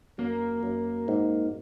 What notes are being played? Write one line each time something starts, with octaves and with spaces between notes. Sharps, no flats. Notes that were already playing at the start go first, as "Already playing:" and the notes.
F#2 A#3
F#2
G#2